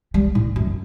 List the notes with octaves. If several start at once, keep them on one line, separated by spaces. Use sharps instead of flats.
G3
A2
F#2